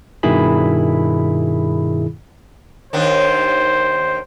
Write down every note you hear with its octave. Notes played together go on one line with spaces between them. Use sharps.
G2 B2 D#3 E4 G#4 B5
D#2 D#3 D4 C5